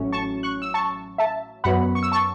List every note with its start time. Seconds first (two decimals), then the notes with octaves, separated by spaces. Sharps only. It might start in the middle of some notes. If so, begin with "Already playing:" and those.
Already playing: A1 A2 F#3 C#4
0.13 A5 C#6
0.43 C#6 F#6
0.62 E6
0.74 A5 C#6
1.18 E5 A5
1.64 F#2 F#3 B3 F#5 B5
1.95 C#6
2.03 E6
2.12 A5 C#6